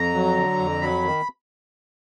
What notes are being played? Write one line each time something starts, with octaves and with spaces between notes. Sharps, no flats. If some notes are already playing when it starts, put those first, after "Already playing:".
Already playing: F2 A#5
F#3
D3
F2
F#3 B5
D#3